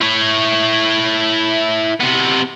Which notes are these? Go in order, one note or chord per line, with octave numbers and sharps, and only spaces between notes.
E4 C#5
C3 B3